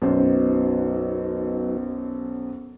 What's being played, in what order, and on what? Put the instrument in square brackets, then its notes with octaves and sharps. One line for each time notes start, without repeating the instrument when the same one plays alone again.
[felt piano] B1 F#2 C5 [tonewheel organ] F#3 B3 D#4